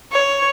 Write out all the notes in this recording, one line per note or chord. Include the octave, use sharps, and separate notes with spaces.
C#5